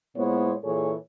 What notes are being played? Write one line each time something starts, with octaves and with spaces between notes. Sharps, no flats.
A#2 G#3 B3 E4 C5 C#5
A#2 E3 G#4 A4 C#5